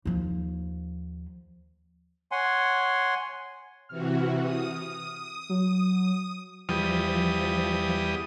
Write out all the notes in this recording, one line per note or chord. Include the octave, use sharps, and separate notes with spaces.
D#2 F3
C#5 F#5 G#5 C6
C3 E3 F#4 F6
D#6
F#3
E2 F3 G3 D#6